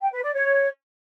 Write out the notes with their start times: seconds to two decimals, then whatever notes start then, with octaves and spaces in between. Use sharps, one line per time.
0.01 G5
0.12 B4
0.23 D5
0.34 C#5